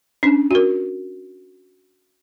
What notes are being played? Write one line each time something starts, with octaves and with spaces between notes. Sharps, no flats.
C#4 D4
F#4 A#4